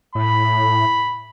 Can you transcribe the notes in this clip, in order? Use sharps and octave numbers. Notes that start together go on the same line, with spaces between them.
A2 B5